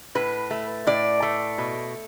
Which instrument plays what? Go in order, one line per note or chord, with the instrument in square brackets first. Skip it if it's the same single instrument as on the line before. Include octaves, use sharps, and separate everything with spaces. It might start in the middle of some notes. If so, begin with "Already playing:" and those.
[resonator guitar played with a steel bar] A2 B4
A3
A2 D5
A3
B2